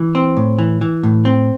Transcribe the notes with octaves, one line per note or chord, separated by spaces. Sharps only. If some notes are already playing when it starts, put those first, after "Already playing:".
Already playing: E3
C4
A2
E3
E3
A2
C4